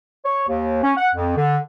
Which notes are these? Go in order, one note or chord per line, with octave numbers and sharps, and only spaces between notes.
C#5
D#2
C#4
F#5
F2
D3